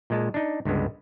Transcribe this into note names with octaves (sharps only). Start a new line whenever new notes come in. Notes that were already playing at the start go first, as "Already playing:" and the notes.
A#2 G#3 A5
D4 D#4
C#2 G2 D3 G#3 B3